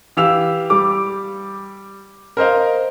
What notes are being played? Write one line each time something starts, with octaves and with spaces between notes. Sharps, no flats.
E3 G4 F5 E6 F7
G3 D6
A#4 C5 D#5 F5